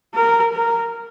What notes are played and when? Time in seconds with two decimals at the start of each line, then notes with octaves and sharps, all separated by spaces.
0.15 A#4
0.53 A#4